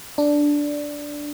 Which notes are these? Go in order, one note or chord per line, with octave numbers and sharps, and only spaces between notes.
D4